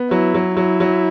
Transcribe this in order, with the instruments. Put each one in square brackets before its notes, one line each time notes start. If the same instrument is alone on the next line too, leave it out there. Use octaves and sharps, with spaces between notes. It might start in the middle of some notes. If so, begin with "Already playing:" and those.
Already playing: [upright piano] B3
[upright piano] F#3 [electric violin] E4
[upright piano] F#3
[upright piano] F#3 [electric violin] E4
[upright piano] F#3